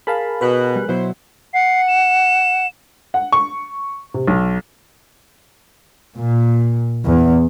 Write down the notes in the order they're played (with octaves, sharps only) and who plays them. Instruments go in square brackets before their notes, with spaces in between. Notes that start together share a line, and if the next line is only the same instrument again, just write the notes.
[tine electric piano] G#4 A#4 G#5 [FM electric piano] F5 A5 B5
[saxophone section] B2 [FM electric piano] B4 B5 F#6
[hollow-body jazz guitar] G3
[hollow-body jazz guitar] B2 F#3 [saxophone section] E4 C5
[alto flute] F#5 [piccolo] C7
[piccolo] E7
[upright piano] F#5
C#6
C3
B1
[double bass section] A#2
E2